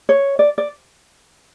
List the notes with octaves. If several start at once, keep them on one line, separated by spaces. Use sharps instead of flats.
C#5
D5
D5